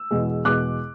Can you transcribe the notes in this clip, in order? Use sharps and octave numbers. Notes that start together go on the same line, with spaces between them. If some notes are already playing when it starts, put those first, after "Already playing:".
Already playing: E6
E2 B2 G#3
E2 B2 G#3 D6 F#6